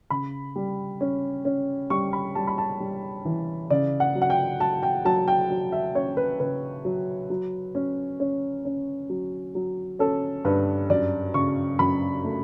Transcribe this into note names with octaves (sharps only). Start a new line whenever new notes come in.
C#3 B5
G3
C#4
C#4
G3 C#6
B5
G3 A5
B5
A5
G3
E3
C#3 D5
F#5
F#3
F#5
G5
F#3 A5
G5
F#3 A5
G5
F#3
E5
C#4 C#5
B4
C#3 B4
F#3
F#3
C#4
C#4
C#4
F#3
F#3
C#4 A4
G2 B4
F#2 D5
C#3 C#6
F#2 B5
A3